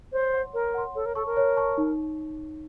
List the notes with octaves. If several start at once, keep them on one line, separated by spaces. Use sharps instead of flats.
C5 C#5
F#5 C6
A#4 C#5
F#5 C6
A4 C#5
A#4
A4 A5 C#6
A#4
C#5
A5 C#6
D#4